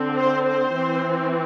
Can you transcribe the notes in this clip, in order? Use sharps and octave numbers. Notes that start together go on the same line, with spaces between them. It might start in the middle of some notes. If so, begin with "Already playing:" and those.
Already playing: D3 C4
C5
C5
E3 C4